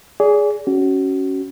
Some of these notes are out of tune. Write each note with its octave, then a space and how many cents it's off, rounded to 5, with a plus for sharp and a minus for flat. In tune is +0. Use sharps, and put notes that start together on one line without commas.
G#4 +0 D5 -30
C#4 +0 F#4 +20